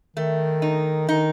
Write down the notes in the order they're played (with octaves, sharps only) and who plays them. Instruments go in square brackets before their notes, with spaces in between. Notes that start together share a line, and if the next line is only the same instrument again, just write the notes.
[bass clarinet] D#3 [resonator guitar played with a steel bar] A3
[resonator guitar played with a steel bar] D#4
[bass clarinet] D#3 [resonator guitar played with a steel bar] D#4